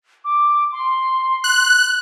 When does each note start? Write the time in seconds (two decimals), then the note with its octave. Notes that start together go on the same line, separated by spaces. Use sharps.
0.25 D6
0.72 C6
1.44 F#6